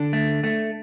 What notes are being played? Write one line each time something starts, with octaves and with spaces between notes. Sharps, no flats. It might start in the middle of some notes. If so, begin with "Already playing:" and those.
Already playing: D3 D4
A3
A3